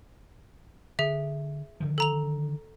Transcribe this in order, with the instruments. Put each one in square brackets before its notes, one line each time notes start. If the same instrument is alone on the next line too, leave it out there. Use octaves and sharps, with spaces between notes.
[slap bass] D3 [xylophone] G#4 E5
[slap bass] D3 D#3 F3
[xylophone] A4 A#5 F7